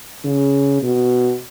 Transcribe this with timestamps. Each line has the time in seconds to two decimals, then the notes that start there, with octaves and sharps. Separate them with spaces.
0.25 C#3
0.83 B2